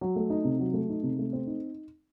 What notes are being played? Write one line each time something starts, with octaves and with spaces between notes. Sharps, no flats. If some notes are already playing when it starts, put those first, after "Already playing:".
F#3
A3
D#4
C3
F#3
A3
D#4
C3
A3
C4
D#4